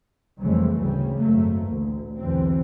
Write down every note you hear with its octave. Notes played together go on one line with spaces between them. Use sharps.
C2 F2 C#3 E3 G#3 A3
G#1 D2 C#3 G3
G#1 F#2 A3 A#3
A1 D2 A#2
B1 E2 D3 E3 C4